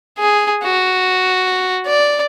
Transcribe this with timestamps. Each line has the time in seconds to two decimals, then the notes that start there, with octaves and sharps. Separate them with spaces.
0.19 G#4
0.64 F#4
1.87 D5